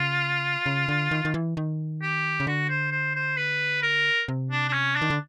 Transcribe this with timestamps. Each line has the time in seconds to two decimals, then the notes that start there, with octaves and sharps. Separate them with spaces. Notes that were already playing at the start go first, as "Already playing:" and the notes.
Already playing: C#3 F4
0.66 C#3
0.88 D3
1.11 D#3
1.25 D#3
1.34 E3
1.57 D#3
2.02 G4
2.40 C#3
2.47 D3 F#4
2.69 C5
2.92 C5
3.16 C5
3.37 B4
3.83 A#4
4.28 C3
4.51 D4
4.68 D4
4.73 C#4
4.96 D4
5.02 D#3
5.10 D3